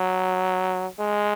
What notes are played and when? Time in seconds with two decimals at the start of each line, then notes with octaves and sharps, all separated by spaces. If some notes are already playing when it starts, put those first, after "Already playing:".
Already playing: F#3
0.99 G#3